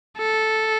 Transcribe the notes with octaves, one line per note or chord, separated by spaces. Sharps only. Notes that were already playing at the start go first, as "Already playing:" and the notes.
A4